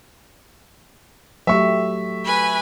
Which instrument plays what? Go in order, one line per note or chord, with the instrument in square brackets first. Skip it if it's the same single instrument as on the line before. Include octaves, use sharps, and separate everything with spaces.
[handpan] F#3 A3 G4 [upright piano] E5 C#6
[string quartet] B4 G#5 B5